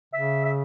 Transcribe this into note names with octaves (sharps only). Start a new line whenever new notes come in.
C#3 E5
E5